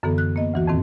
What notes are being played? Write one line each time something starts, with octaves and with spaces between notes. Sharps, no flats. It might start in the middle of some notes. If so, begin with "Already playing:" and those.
F#2 D3 E3 B3 A4
F#6
A#3 B3 D#5
D2 E3 F#4
F2 A2 D#3 C4